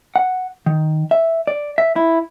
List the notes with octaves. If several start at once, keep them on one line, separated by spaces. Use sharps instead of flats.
F#5
D#3
E5
D5
E5
E4